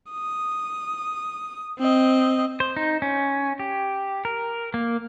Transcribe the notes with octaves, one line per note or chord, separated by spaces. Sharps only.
D#6
C4 D#5
C5
D#4
C#4
G4
A#4
A#3